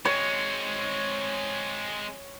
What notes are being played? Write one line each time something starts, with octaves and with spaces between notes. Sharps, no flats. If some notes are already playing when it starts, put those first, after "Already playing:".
G#3 C4 C#5